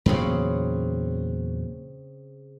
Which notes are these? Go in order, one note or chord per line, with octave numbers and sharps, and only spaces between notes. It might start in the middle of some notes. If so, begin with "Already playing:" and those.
E2 A#2 C#3 F#3 C4 B5